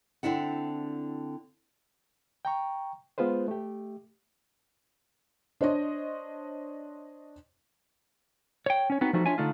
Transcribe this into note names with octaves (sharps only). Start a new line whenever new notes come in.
D3 C4 D4 E4 F#5
G5 A#5 C#6
G#3 B3 F4 G#4 B4 C5
A3 G4
D4 C5 C#5 D#5
C#5 G5
C#4 C#5
B3 C4 D#4 F#4 B4
F3 G3 A3 B3 D#4 F#4
D4 F4 C#5 E5 G#5
D3 A3 D4 D#4 F4